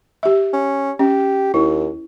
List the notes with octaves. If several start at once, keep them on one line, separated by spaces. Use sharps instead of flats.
G4 E5
C#4
C#4 G4
D#2 E4